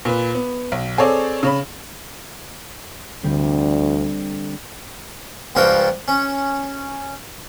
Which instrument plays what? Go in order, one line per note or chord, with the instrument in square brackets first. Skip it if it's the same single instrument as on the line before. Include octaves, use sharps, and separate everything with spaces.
[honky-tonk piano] A#2 B4
B3
B1
C4 G#4 A4 C#5 D5
C#3 C#5 B5
[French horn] D2 [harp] D3 G3 C4
[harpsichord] C#2 G2 F3 F4 F#4 G5
C#4